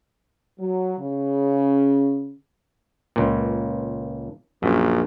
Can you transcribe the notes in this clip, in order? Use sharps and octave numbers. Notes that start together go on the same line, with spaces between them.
F#3
C#3
C#2 A#2
A#1 F#2